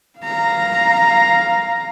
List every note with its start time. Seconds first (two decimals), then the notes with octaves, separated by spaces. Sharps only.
0.19 F5 A#5